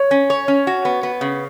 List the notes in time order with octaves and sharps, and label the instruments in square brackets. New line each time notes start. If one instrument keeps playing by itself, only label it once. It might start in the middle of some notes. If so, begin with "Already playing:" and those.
Already playing: [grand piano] C#5
[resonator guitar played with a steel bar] C#4
C#5
C#4
F#4
B3
B3
C#3